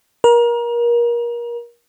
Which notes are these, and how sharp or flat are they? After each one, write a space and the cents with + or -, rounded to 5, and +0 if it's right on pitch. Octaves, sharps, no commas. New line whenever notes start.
A#4 +30